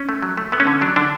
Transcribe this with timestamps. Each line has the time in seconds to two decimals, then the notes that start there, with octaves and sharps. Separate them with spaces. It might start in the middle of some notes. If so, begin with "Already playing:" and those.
Already playing: C#4
0.09 A3
0.22 F#3
0.37 A3
0.52 A3 B3
0.60 C#4
0.67 D3
0.81 F#3 D4
0.96 D3 D4